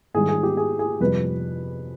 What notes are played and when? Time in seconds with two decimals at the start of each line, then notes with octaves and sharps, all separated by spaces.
0.14 G#2 D#3 G3 G#4
0.29 G#4
0.43 G4
0.57 G#4
0.79 G#4
1.00 F2 C3 G3 B4